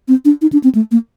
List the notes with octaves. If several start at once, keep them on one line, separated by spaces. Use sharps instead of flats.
C4
D4
D#4
D4
C4
A3
A#3